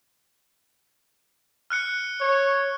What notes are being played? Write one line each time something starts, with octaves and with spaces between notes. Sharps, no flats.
F6 F#6 C#7
C#5